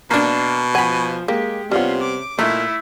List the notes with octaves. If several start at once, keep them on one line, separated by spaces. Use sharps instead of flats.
B2 A#3 D4
F3 F#5 G#5 B5
G#3 A#3 G4
C3 G3 B3 C#4 F4
D6
A#2 A3 D#4 E4